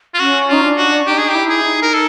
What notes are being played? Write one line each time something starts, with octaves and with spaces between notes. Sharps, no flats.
F4
C#4 F#4
D#4 F4
D4
F#4
D#4 G4
G#4
E4 G4
G#4
D#4
A#4
A4